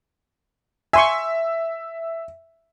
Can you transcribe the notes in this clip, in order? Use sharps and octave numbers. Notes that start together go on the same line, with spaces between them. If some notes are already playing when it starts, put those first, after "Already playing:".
E5 G#5 C6 C#6